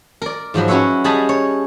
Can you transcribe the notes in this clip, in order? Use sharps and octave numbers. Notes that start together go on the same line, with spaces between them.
A#4 D5
G#2 F3 F#3 B5
F#3 C#4 F#4 B4 C#5 E5
G3 G#4 D#5 A5 B5
C#5